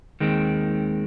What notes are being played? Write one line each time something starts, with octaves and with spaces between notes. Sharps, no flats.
D#2 D#3 G#3 C4